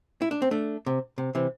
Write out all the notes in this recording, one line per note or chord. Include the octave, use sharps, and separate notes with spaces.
E4
D4
C4
A3 D4
C3
C3
C3 E3